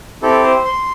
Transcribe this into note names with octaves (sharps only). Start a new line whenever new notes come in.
C4 E4 G4 A4
C5
C6